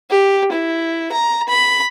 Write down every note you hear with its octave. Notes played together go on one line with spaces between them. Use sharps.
G4
E4
A#5
B5